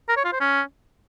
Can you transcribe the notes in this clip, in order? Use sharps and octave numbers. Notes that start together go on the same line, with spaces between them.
A#4
C#5
F4
C5
C#4